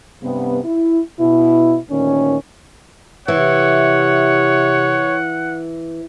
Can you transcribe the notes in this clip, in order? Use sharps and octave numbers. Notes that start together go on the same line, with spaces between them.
G2 C3 B3
E4
B2 E4
D2 A#2 D#3 C#4
C3 E3 C#5 F#5